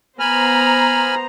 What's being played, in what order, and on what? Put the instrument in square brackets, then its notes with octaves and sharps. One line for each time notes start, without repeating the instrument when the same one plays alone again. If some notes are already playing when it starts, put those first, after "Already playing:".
[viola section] B3 C5 A#5 [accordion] G#5 B5 F6